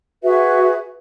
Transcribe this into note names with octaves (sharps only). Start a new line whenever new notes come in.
F#4 G#4 B4 E5